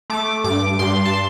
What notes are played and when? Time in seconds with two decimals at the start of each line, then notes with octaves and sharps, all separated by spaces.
0.10 A3 D6
0.44 G2 D6
0.79 G2 C6
1.05 A5
1.14 C6